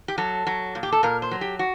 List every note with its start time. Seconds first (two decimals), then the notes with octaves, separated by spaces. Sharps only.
0.08 G4
0.18 F#3 A4
0.47 F#3
0.75 A#2
0.83 G4
0.92 A4
1.03 A#2 A#4
1.22 C5
1.31 F#3
1.41 G4
1.59 F#4